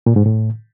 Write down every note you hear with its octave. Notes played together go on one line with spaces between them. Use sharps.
A#2
G#2
A2